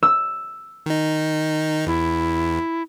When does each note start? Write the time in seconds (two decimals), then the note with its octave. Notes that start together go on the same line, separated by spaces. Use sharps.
0.03 E6
0.86 D#3 D#4
1.87 E2 E4